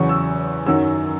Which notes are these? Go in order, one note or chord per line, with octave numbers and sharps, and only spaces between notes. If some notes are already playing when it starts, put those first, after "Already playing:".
Already playing: E2 C#3 F#3 C#6
E6
F#2 D#3 F#3 E6